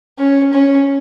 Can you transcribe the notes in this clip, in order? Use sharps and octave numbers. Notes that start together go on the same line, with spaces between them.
C#4
C#4